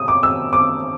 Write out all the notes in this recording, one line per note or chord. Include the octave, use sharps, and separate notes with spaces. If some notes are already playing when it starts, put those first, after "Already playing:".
Already playing: C3 D#6
D6
E6
D6